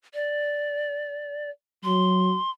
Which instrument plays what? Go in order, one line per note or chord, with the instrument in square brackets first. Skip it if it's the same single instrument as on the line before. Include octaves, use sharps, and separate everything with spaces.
[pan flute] D5
[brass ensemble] F#3 [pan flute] C6